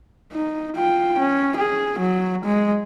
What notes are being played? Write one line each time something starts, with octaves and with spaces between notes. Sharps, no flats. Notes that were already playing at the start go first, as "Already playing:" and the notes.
D#4
F4 G5
C#4
G#4
F#3
G#3